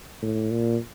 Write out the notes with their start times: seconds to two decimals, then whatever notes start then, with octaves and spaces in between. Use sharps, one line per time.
0.22 A2
0.51 A#2